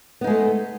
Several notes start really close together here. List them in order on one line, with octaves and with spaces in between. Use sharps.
B3 D#4 G#3 A3